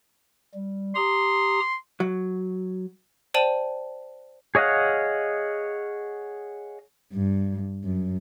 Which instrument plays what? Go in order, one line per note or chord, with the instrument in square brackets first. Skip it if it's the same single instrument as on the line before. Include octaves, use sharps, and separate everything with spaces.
[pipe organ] G3
[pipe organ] G4 A#5 D#6 [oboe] C6
[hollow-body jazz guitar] F#3
[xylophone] C5 D5 G5 A5 D#7 F#7
[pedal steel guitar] G#4 C#5 D#5 F5 F#5
[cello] G2
F#2